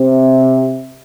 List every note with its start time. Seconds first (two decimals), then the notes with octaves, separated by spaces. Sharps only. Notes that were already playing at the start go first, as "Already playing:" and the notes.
Already playing: C3